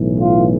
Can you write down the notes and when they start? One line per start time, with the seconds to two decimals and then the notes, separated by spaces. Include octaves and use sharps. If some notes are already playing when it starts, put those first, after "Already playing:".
Already playing: B1 A2 E3
0.21 F4